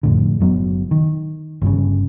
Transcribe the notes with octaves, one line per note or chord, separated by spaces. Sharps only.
F2 A2 D3
F#1 F#3 B3
D#3
G1 G2 C#3